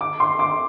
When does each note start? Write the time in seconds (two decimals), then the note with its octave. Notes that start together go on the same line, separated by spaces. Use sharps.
0.01 D6
0.20 C6
0.39 D6